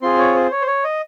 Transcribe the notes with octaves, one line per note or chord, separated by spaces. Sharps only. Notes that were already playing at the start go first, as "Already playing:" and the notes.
C4 F4 G#4 C6
C#5
C5
C#5
C5
C#5
D#5